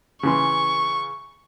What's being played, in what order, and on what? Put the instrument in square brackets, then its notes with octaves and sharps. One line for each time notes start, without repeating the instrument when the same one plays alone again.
[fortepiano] C#3 E3 C6 [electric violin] C#6